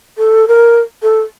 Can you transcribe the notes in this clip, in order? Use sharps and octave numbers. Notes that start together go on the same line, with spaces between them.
A4
A#4
A4